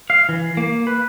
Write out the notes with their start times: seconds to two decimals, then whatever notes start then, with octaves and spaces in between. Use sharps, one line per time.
0.10 F5
0.29 E3
0.57 A#3
0.87 B4